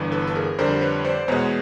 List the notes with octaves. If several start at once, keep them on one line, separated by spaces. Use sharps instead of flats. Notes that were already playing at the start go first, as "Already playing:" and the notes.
Already playing: G1 G2 E3
A4 B4
A4
G#4 A#4
F2 D3 G3 A#4 C5
B4 C#5
C5 D5
E2 B2 G#3 B4 C#5